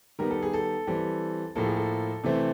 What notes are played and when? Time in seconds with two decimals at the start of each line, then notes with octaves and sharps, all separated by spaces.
0.19 D#3 G3 B3 A#4
0.30 A4
0.42 G#4
0.53 A4
0.87 E3 G3 C4
1.55 A2 F3 A#3 A4
1.66 G#4
1.76 A4
2.24 C3 E3 A3 C4